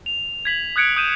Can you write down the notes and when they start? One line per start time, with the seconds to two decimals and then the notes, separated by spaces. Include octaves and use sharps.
0.06 F7
0.45 G#6 B6 F#7
0.76 D#6 F#6 G#6 C#7 D7
0.96 D#6 G6 D#7 E7